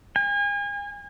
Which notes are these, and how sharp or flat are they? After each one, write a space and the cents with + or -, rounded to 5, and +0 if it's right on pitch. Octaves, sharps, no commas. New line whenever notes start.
G#5 -35